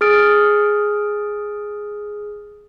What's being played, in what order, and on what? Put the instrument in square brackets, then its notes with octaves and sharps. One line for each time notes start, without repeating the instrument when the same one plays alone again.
[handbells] G#4 D#6 F6 A6 D7